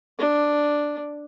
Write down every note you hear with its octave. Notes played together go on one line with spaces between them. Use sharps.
D4